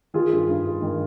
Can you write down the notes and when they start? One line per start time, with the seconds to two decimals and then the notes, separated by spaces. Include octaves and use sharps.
0.14 D#3 F4 G#4
0.32 G2
0.49 G2
0.66 G2
0.82 D#3